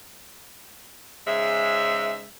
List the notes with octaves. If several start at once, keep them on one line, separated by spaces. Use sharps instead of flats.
G#2 C#3 G#3 E5